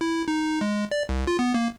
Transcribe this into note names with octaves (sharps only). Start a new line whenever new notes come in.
E4
D#4
G#3
D5
C2
F4
B3
A#3